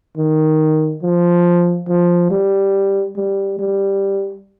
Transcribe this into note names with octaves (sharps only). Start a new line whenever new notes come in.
D#3
F3
F3
G3
G3
G3